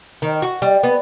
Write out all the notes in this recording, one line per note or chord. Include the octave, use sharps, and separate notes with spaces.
D#3
F#4
G3
B3